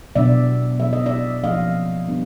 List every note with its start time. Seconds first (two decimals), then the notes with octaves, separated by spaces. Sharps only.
0.15 B2 F#3 B3 D4 D5 E5
0.80 B2 F#3 B3 E5
0.93 D#5
1.06 D5 E5
1.43 F3 A#3 C#4 D#5 F5
2.08 G3 B3 D4